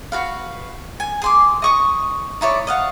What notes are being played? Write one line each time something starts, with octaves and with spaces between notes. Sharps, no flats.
F#4 B4 F5
G#5
G#4 C6 D6
D#5 C#6 D#6
D#4 E4 C#5 D5
D#5 F5 F#5